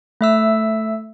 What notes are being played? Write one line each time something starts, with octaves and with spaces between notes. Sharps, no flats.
A3 E5 E6